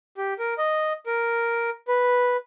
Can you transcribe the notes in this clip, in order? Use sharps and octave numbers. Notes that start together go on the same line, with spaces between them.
G4
A#4
D#5
A#4
B4